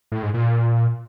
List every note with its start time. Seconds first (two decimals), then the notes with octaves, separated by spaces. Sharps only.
0.12 A2
0.23 G#2
0.34 A#2